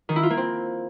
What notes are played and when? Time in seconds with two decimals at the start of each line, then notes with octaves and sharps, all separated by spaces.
0.09 D#3
0.16 E4
0.23 F4
0.30 A#3
0.37 C4